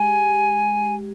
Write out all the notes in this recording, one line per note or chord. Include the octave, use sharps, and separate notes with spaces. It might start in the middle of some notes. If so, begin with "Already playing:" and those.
Already playing: G#3 G4 G#5